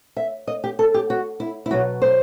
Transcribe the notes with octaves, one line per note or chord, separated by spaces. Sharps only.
E5
D#5
G4
A4
G4
F#4
E4
E4
B2 F#3 F#4
C5